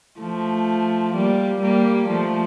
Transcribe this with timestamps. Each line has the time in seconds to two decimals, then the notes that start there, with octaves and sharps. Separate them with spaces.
0.21 F3 A3
1.15 G3 A#3
1.61 G3 A#3
2.08 F3 A3